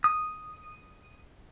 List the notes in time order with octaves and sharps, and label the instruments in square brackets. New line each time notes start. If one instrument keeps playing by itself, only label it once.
[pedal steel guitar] D#6